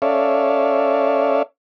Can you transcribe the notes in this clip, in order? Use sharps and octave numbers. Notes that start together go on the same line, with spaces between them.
C#4 A4 C#5 D5 E5 F5